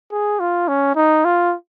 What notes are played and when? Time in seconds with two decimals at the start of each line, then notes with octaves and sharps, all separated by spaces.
0.12 G#4
0.40 F4
0.68 C#4
0.96 D#4
1.25 F4